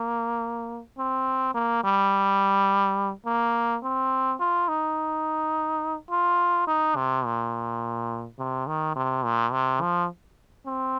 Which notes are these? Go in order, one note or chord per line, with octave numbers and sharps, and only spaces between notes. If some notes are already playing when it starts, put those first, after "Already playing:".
Already playing: A#3
C4
A#3
G3
A#3
C4
F4
D#4
F4
D#4
C3
A#2
C3
D#3
C3
A#2
C3
F3
C4